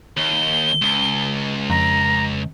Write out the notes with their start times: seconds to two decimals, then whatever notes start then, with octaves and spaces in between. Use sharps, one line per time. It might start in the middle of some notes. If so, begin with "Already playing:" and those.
0.17 D#2 G7
0.82 C#2
1.70 F2 A#5